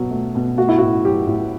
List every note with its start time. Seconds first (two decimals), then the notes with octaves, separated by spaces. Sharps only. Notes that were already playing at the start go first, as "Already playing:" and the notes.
Already playing: B2 F#3
0.11 A3
0.35 B2
0.57 A3 F#4
0.69 E4
0.78 F#4
0.81 A2
1.05 F#3 G4
1.27 A2